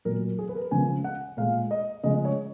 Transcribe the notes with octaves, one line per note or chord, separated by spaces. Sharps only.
A#2 F#3 A#4
G#4
B4
A#4
C#3 F3 G#3 G#5
F#5
A#2 G#3 F5
D#5
C#3 F3 G#3 D#5
C#5